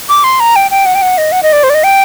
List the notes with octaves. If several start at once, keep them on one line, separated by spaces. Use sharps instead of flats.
D6
C6
A#5
G5
G5
F#5
G5
F#5
D#5
F#5
D#5
D5
C5
D5
D#5
G5